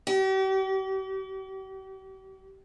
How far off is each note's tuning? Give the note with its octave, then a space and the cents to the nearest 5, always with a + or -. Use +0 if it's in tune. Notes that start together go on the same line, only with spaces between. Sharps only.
G4 -40